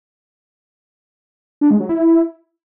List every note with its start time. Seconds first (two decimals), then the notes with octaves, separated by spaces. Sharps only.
1.61 D4
1.71 G#3
1.80 F#3
1.89 E4